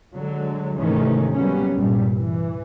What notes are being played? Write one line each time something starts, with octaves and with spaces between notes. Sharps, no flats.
D3 F#3 G#3
G#2 C3 D#3 E3 A3 C#4
F#3 G3 A#3 B3 C#4
C2 G2 A#2 G3
E3